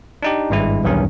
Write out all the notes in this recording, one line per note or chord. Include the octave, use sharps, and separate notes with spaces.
D4 D#4 G4
G#1 G2 G#3 E4
B1 E2 G2 D#3 C#4